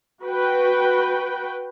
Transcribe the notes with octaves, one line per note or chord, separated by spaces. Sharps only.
F#4 B4 G5